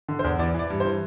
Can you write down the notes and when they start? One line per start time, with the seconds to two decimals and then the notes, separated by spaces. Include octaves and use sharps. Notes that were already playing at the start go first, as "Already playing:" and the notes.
0.08 D3
0.19 C5
0.24 E2
0.39 E3 D5
0.54 E3 D5
0.70 G2
0.80 C5
0.85 E3